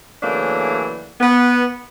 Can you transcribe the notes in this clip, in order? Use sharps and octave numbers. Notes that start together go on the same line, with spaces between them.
C#3 E3 F#3 A3 A#3 D4
B3